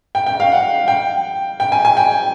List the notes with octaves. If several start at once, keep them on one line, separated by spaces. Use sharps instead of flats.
G5
G5
F5
F#5
G5
G5
G#5
G#5
G5